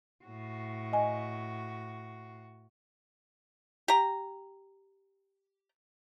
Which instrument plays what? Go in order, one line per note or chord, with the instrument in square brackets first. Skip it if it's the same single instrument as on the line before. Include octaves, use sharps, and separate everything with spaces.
[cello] A2 F#4
[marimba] D#5 G#5
[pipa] G4 A#5